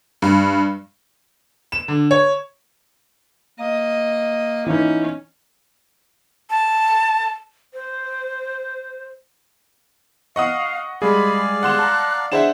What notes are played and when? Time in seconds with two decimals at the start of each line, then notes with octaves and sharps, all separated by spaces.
0.22 G2
1.72 E7
1.88 D3
2.11 C#5
3.59 A#3 D#5
4.67 E3 C#4 D#4
6.50 A5
7.74 C5
10.36 D#5 F5 F#5 C#6 D#6 F6
11.02 G3 G#3 G#4 D5 F5 B5
11.63 F#5 C6 F#6 E7
11.79 A5 A#5
12.32 D4 G#4 C5 E5 F#5 E7